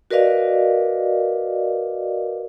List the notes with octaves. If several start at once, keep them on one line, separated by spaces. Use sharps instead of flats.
F#4 A#4 B4 D5 D#5 F5